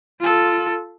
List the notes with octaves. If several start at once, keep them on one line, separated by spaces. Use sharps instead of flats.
F4 A4